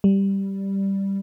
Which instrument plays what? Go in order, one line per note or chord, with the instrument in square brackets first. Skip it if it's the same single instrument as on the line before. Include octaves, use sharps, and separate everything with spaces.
[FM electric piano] G3